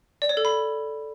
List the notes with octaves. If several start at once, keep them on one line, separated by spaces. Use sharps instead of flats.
D5
C#5
A4
B5